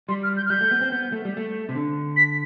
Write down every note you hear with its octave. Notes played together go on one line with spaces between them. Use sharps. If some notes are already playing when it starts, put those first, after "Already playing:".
G3 C6
F6
G6
F6
G3 G6
A3
B3
C4
B3
A3
G3
A3
C3
D3
B6